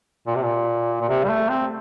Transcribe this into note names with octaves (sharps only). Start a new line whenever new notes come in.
A#2
C3
A#2
A#2
C3
G3
A3
C4